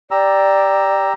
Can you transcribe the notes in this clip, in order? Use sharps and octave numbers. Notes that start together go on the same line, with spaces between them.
G4 D5 A#5 E6